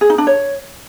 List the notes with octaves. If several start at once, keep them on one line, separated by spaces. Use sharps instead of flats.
G#4
D#4
D4
C#5